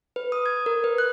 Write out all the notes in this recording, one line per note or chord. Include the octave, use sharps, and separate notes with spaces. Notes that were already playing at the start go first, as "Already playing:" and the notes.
B4
D#6
G#6
A#4
B4
F#6